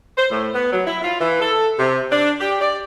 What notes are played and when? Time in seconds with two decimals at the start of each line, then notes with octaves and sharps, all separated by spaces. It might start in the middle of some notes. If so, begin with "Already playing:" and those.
0.17 C5
0.31 A2
0.54 B3
0.72 F#3
0.86 E4
1.02 F4
1.20 E3
1.41 A4
1.78 C3
2.11 D4
2.41 G4
2.61 D5